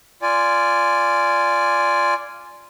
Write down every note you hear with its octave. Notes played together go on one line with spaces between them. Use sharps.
F4 D5 G#5